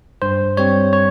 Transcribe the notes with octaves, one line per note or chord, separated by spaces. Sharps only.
G2 C5
G3 C4 C#5
C#5